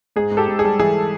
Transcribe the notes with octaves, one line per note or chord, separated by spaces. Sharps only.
G#2 G#4
G#2
G4 A4
G#2
G#4
G3
E3 G#4